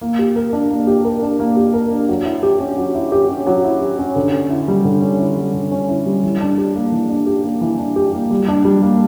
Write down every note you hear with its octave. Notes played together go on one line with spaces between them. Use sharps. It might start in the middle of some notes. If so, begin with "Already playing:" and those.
A#3
G4
A#4
D4
A#3
G4
A#4
D4
A#3
G4
A#4
D4
F#3
E4
G4
C#4
F#3
E4
G4
C#4
F#3
E4
G4
C#4
D3
C#4
E4
G3
D3
C#4
E4
G3
D3
C#4
E4
G3
E3
D4
G4
A#3
E3
D4
G4
A#3
E3
D4
G4
A#3
G3
D4
G3
A#3